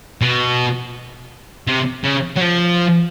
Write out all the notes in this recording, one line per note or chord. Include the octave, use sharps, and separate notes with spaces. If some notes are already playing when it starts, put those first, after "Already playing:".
B2
C3
C#3
F#3
F3